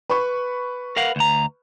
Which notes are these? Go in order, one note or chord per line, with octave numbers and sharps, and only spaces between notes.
B4 B5 C#6
A#4 F5 F#5
D2 A#5